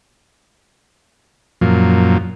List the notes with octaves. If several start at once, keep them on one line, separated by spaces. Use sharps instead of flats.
F#2 A#2 F3